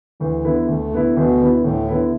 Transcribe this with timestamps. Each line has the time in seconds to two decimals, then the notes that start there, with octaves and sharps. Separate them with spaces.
0.20 D2 E3
0.45 D3 B3 E4
0.68 D2 A3
0.92 D3 B3 E4
1.16 D2 B2
1.41 D3 B3 E4
1.64 D2 A2
1.88 D3 B3 E4